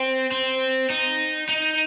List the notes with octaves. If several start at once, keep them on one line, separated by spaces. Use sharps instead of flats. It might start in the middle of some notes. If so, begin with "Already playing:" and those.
Already playing: C4
C4
D#4
D#4